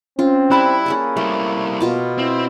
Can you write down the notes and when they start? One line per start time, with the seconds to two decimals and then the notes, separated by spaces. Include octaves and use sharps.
0.19 C4 C#4 F4
0.51 G3 E4 A5 B5 F#6
0.86 A#3 C#4 G#4 A4
1.17 G3 A3 E4
1.80 B2 F4 D6
2.18 C4 E4